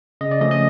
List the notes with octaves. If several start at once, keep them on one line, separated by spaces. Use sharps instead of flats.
C#3 D#5
D5
F3 A3 C#4 D#5
D#5